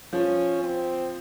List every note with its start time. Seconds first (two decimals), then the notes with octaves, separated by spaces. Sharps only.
0.13 F3 C#4
0.63 C4